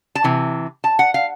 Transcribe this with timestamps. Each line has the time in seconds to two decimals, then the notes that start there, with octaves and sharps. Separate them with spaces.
0.15 A5
0.24 C3 E3
0.84 A5
0.99 F#5
1.14 F5